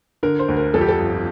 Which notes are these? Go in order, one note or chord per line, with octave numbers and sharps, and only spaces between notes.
D3 A#4
C5
D2
A#4
F2 A4
G4
A4
G1